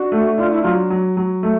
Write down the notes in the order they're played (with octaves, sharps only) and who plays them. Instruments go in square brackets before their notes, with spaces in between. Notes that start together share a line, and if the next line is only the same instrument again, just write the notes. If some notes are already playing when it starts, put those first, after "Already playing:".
Already playing: [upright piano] D4 [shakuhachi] F#4
[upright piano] A3
[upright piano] D4 [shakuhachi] F4
[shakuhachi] E4
[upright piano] F#3 [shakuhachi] F4
[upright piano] F#3
F#3
A3